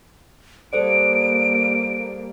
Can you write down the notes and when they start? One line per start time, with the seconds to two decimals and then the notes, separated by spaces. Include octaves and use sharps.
0.73 G3 A#3 A4 C5 D5 D7